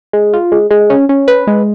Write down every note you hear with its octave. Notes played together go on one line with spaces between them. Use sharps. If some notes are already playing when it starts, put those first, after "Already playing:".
G#3
F4
G#3
G#3
C#4
C#4
B4
G#3